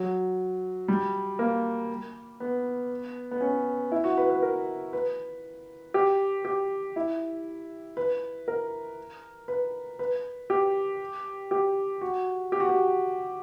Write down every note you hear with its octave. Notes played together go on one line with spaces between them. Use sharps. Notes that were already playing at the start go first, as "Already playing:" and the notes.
Already playing: F#3
G3
A#3
B3
B3
C#4
E4
F#4
B4
B4
A#4
B4
G4
G4
E4
B4
A#4
B4
B4
G4
G4
F#4
G4
F#4
G4